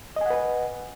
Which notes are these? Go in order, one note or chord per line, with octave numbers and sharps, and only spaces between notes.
B4 D#5 F#5 G#5